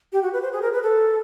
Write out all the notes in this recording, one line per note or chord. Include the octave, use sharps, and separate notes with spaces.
G4
F#4
B4
C5
G#4
A#4
B4
A4